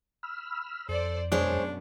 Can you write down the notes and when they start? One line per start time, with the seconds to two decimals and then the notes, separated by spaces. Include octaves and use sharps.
0.23 B5 E6 F6
0.89 F2 A4 C5 D5
1.32 F#2 B2 G#3 D4 C5 C#5